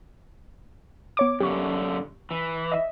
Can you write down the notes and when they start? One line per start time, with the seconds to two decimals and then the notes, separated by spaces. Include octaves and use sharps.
1.17 B3 C#5 D6
1.40 F#2 D3 G4 C#6
2.31 E3
2.72 D#5 E5